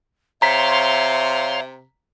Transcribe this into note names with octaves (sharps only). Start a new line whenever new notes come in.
C3 C#5 E5 F5 A#5 C6 B6